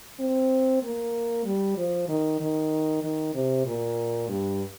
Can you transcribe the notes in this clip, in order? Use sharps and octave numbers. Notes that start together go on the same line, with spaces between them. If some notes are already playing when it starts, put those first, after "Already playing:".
C4
A#3
G3
F3
D#3
D#3
D#3
C3
A#2
G2